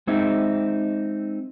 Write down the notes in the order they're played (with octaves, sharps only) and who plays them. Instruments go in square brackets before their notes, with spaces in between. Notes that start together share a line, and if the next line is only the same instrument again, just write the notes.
[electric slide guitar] G#3 C4 D#4 E5